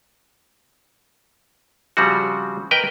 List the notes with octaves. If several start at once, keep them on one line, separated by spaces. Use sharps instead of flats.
C#3 F3 G3 C4 F#4
A#4 B4 D#5 G5